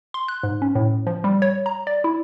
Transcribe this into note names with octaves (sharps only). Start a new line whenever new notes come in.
C6
F#6
G#2
C#4
A2
F3
G3
C#5
A#5
D5
E4